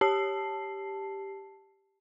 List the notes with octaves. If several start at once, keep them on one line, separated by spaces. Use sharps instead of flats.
G4 A5 C7